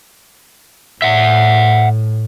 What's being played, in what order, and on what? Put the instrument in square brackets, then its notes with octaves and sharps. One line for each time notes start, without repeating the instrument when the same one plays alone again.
[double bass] A2 [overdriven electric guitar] E5 F#5